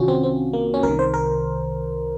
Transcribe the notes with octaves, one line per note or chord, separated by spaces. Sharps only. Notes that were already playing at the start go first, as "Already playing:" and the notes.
Already playing: C2 C3 D#3 C#4 F4 F#4
C4
C4
A#3
C#4
C2 C3 D#3 A#4
C5
A#4